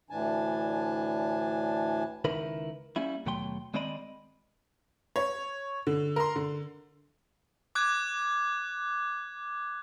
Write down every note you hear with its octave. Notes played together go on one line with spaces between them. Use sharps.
D2 A2 E3 D4 G#5 A5
C#2 D#3 E4 A#4 B4 B5
G3 A#3 C#4 E4
D#2 B2 F#3 A3 G5 C6
D#3 G#3 C4 D5 D#5 B5
C#5
D3
A#4 C6
D3
D6 F#6 G#6